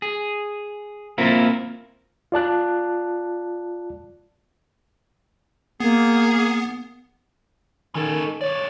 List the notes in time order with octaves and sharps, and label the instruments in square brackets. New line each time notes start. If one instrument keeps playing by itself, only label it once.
[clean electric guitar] G#4
A#3 C4 E4 F4 A#4
[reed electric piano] F4 D5 A5 F#6
[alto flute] A#3 [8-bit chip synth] B3 [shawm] G#4
[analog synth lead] D#3 [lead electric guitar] C#4 A4
[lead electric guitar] B1 D5 [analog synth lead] C#5